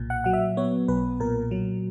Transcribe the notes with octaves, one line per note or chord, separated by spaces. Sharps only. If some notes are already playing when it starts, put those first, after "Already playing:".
Already playing: B1 A#2
F#5
F#3 F#5
E5
B3 C#5
B1 B4
A#2 A#4
F#3